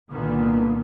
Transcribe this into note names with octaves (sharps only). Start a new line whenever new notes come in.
C2 A#2 D3 D#3 A#3 B3